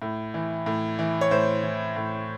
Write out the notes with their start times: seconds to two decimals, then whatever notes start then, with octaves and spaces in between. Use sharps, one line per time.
0.02 A2
0.34 E3
0.66 A2
0.99 E3
1.21 C#5
1.31 A2 C5
1.63 E3
1.96 A2